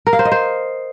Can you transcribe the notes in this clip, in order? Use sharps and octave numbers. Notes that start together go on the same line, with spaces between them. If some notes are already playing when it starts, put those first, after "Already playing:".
A#4
F5
C5
D#5
C5